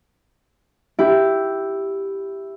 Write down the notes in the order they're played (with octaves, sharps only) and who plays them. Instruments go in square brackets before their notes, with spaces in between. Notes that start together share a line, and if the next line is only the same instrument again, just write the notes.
[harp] E4 G4